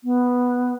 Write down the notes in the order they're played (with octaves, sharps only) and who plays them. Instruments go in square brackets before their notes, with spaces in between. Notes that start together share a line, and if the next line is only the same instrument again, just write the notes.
[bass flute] B3